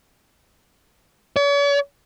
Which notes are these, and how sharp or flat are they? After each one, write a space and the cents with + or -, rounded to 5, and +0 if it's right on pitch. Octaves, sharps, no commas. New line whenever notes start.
C#5 +45